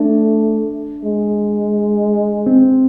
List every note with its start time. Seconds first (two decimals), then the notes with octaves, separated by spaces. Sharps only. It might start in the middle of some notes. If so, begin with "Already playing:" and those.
Already playing: A3 D4
1.05 G#3
2.46 C4